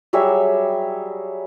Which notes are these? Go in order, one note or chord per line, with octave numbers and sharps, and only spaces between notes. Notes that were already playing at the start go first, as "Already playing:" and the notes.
F#3 G3 G#4 E5